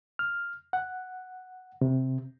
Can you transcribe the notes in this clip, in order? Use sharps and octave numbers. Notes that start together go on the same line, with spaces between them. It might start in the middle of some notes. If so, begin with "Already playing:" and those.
F6
F#5
C3